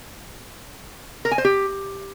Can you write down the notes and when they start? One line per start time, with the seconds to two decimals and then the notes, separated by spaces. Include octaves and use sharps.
1.25 A#4
1.31 G#5
1.38 C5
1.45 G4